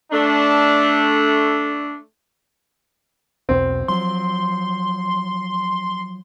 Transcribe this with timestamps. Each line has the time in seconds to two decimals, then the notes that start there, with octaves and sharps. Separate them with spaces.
0.12 A3 D4
3.49 B1 E2 B2 C4
3.88 F3 F#3 C6